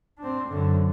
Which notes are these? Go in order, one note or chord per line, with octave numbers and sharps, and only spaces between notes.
C4 D4
F#2 D3